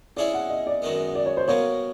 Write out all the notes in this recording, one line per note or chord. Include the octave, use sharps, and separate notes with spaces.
G#3 C#4 E4 G#4 D5
F#5
D#5
D5
F#2 D#3 G#3 B3
D5
C#5
C5
B2 G3 A#3 C#5